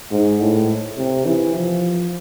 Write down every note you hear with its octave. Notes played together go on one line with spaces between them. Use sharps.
G#2
A2
C3
E3
F3